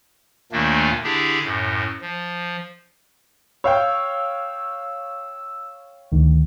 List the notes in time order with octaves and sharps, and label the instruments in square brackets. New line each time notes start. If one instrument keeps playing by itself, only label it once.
[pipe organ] D#2 A#2 D#3 A3 A#3 D4
D3 D4 E4 G4 G#4
F#2 A2
F3
[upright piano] C#5 F5 G5 [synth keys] E6
[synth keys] D2 D#3